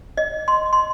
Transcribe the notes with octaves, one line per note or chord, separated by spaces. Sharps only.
D#5
C6
C6